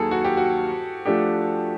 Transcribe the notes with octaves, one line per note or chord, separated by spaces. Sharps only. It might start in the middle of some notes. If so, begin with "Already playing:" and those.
Already playing: D#2 D#3 F#3 A#3 G#4 A4
F#4
G4
F#4
F3 A3 D4 G4